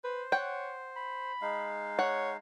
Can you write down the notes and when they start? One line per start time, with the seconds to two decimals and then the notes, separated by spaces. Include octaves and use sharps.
0.04 B4 C5
0.32 C#5 F#5 G5
0.96 B5
1.42 G#3 D#4 F5
1.99 C#5 F#5